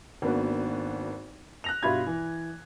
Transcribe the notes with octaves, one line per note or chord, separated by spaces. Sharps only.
G#1 A#3 B3 D4 F#4
F#6 A#6 F7
G2 B2 F4 E5 B5 G#6
E3